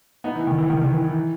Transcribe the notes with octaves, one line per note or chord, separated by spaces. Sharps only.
B3 D#4
E3
D#3
E3
D#3
D#3
E3
E3
E3